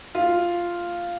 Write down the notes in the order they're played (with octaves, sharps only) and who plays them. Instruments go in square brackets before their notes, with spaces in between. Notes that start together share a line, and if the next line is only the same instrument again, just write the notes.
[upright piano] F4